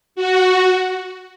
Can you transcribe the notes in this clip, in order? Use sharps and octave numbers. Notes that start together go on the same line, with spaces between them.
F#4